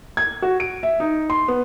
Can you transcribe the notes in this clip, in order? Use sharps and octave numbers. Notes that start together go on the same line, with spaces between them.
G#6
F#4
D7
E5
D#4
C6
B3